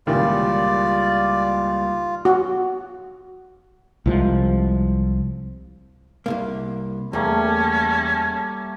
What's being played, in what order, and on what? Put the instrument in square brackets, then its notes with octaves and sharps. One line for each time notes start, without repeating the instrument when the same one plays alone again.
[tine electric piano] C#2 G3 [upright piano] A#2 D#3 E3 [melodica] F4 [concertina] D5
[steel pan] F#4
[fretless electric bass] C2 F3 G#3
[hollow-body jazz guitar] C2 G#2 A#3
[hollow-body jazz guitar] E2 [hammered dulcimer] G3 A3 A#3 [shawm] C#4 [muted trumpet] A5